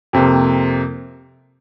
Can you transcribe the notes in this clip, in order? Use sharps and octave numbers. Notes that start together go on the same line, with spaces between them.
F2 C3 A#3